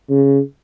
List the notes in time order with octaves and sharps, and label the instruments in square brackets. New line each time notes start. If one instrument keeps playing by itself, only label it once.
[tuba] C#3